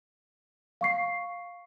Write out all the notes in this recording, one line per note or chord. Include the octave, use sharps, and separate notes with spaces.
F5 C#6 C7